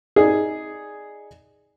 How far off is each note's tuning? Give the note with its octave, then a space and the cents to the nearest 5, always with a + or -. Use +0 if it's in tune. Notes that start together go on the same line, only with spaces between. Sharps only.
D#4 +15 G#4 +0 D5 +0